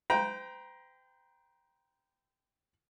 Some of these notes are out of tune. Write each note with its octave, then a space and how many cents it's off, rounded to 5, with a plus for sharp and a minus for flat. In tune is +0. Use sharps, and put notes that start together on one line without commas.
C5 -40 G5 +0 A#5 +20